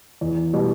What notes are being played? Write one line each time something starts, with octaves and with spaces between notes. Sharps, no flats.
E2
B2 G3